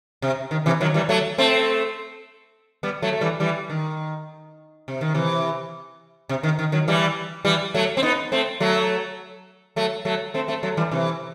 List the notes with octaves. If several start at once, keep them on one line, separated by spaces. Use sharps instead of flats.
C3
D#3
C3 E3
D#3 F#3
E3 G3
F#3 A3
A3 C4
G3 B3
F#3 A3
A3
E3 G3
E3 G3
D#3
C3
D#3
C3 E3
C3
D#3
D#3
D#3 F#3
E3 G3
E3 G3
F#3 A3
C4
B3 D#4
A3 C4
F#3 A3
F#3 A3
F#3 A3
A3 C4
A3 C4
F#3 A3
E3 G3
C3 E3